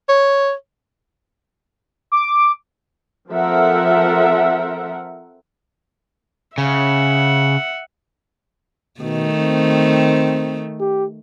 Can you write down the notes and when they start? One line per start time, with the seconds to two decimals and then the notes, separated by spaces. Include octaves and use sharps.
0.09 C#5
2.12 D6
3.30 F3 C4 A4 A#4 E5 F#5
6.58 C#3 E5 F#5
9.01 B2 D#3 A3
9.37 C4
10.80 G4